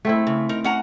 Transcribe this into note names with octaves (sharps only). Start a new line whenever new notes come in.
A3 C4 E4
C#3
D#4 A#4
C#4 F#5 A#5